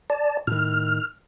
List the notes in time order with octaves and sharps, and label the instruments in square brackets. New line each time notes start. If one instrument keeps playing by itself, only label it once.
[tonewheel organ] D5 A5
[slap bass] A2 D#3 [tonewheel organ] F6